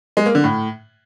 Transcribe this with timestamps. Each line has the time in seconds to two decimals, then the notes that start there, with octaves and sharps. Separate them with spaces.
0.17 G#3
0.26 A#3
0.35 D3
0.44 A2